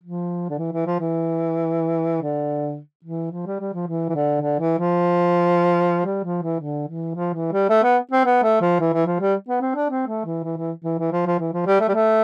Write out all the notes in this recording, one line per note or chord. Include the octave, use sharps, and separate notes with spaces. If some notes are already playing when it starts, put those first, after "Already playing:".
F3
D3
E3
E3
F3
E3
D3
E3
F3
G3
G3
F3
E3
E3
D3
D3
E3
F3
G3
F3
E3
D3
E3
F3
E3
G3
A3
B3
C4
B3
A3
F3
E3
E3
F3
G3
B3
C4
D4
C4
A3
E3
E3
E3
E3
E3
F3
F3
E3
F3
G3
A3
G3
A3